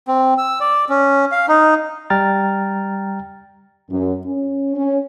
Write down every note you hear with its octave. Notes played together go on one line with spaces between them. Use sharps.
C4
E6
D5
C#4
F5
D#4
G3 G5 A#5 F6 A6
F#2
C#4
C#4